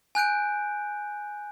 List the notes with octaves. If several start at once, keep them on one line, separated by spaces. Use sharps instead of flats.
G#5 F#6 G6 D7